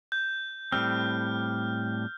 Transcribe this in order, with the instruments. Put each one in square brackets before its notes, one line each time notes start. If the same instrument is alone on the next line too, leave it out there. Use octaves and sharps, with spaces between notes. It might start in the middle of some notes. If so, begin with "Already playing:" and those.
[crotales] G6
[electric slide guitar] A2 G3 C4 [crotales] F6